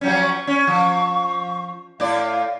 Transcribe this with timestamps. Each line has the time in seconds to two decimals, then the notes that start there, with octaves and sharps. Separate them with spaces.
0.01 F3 F#3 C#4
0.21 C#6
0.47 C#4
0.67 F3
2.00 A2 D5 F5